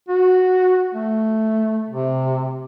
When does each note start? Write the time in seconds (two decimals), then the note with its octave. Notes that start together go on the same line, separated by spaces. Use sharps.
0.09 F#4
0.94 A3
1.88 C3